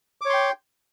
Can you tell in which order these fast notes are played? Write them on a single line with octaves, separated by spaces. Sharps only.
D6 C#5 C6 G5